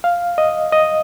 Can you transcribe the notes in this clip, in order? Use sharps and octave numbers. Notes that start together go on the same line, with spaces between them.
F5
D#5
D#5